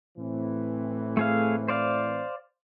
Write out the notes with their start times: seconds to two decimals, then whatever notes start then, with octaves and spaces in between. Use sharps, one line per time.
0.18 A2 E3 C4
1.17 A3 G#4 F5
1.68 C5 D5 F5